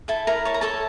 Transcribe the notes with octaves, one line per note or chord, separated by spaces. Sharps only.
E4 A4 A5
E4 A#4 A#5
C#5 A5
A#5
A4 C#5 A5